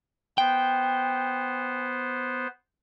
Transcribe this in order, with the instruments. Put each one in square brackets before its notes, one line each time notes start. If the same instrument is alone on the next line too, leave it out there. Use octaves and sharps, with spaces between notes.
[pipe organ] B3 C5 [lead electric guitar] G5